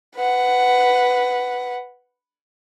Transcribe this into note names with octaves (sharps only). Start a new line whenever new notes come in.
B4 F#5